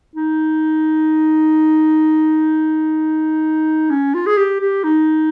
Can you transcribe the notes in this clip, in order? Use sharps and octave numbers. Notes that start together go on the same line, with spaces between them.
D#4
C#4
F4
G#4
G4
G4
D#4